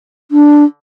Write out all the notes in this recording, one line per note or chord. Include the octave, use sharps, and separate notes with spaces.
D4